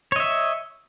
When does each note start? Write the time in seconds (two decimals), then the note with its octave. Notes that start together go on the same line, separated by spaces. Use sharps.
0.12 C#5
0.16 D#5
0.20 E5